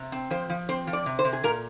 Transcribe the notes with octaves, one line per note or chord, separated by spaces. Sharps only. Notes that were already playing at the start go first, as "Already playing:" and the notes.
Already playing: C3
C4
F3 C5
F3
C4 C5
F3
D5
C3
C5
C3
G#4
A#2 A#4